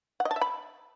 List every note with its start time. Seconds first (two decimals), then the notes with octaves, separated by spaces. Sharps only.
0.20 F#5
0.25 D#5
0.31 A5
0.36 E5
0.41 B5